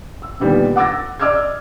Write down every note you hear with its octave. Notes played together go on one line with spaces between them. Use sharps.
E6
A#2 D3 D#3 G3 B3
F#5 D6 E6 A6 A#6
D5 D#5 D6 E6 F6 G#6